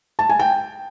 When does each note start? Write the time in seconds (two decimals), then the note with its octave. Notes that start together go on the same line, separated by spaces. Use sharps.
0.19 A5
0.29 G#5
0.39 G5